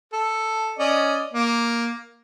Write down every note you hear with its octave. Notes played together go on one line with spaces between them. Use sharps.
A4
C#4 D5 D#5
A#3